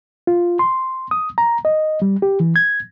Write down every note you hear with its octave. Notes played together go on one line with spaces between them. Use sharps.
F4
C6
D#6
A#5
D#5
G3
G4
E3
G#6